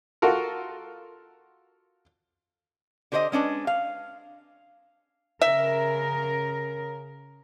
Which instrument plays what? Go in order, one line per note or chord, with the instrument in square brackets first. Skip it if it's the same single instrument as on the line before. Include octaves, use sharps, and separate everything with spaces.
[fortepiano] F4 F#4 A4 A#4
[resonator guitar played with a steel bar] D3 G4 C5 C#5 D#5
G#3 C#4 D4 B4
F5
[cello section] C#3 A#4 [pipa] E5